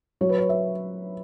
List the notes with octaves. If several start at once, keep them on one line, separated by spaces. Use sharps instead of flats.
F#3 C#5
B4
C#5
E5